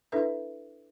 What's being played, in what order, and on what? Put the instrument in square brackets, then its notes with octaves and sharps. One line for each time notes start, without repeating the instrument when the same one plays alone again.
[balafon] D4 E4 A4 B4 E5